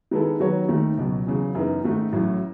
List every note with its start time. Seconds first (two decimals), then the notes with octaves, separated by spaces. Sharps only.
0.11 D#3 G#3 B3 E4 A4
0.40 D#3 F#3 B3 F#4 C#5
0.69 D#2 D#3 A3 D#4
0.98 C#2 B2 F#3
1.27 E2 C#3 F#3
1.55 F#2 E3 B3 D#4
1.84 G#2 D#3 A3 D#4
2.12 A1 A2 F#3